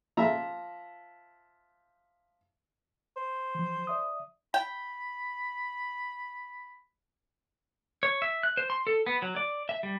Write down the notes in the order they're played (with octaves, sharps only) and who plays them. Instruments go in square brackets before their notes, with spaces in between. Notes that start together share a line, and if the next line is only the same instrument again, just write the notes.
[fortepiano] F3 E5 A#5
[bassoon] C5
[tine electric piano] E3 F3
D5 E5 D#6
[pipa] G5 [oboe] B5
[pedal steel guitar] C#5
E5
F#6
C5
C6
A4
B3
F#3
D5
E5
G3